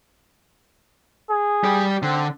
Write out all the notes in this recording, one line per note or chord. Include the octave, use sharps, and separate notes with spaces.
G#4
G3 G4
D3 C4